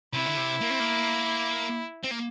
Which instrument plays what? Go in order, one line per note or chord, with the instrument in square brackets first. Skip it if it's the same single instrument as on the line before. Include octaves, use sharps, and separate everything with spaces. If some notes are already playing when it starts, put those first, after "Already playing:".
[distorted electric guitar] C3 [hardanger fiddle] E4
[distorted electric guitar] D3
C3
A#3
C4
A#3
C4
A#3